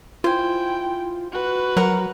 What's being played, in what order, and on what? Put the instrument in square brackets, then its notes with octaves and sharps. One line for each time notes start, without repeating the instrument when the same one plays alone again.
[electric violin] E4 G5 [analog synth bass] F4 [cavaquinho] C5 G#5
[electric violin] F#4 B4
[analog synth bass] F#3 [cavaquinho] A#4 F#5